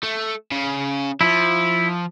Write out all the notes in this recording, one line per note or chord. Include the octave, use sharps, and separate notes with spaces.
A3
C#3
F3 E4